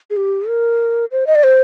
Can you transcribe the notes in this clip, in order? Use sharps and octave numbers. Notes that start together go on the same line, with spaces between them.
G#4
G4
A#4
C5
D#5
D5
C5